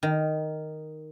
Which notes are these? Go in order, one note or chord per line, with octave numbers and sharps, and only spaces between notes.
D#3